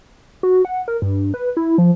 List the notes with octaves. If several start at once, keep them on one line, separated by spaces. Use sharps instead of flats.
F#4
F#5
A#4
G2
B4
E4
F3